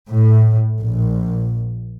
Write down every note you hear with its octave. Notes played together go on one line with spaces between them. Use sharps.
A2
A#1